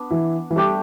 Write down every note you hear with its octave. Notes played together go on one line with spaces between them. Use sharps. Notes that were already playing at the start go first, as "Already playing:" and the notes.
Already playing: B3 D4 B4
E3 E4
E3
G3 A3 D4 G4